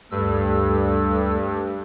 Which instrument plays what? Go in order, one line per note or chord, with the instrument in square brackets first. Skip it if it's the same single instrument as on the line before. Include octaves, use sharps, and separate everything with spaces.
[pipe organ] D2 A4 E6 [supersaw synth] G2